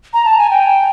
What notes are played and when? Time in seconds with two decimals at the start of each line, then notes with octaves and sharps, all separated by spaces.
0.13 A#5
0.25 A5
0.38 G#5
0.50 G5